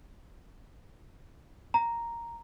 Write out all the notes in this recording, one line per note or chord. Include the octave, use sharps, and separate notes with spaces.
A#5